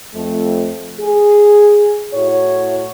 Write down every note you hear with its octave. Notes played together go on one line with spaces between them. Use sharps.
F2 A3
G#4
A2 E4 F#4 C#5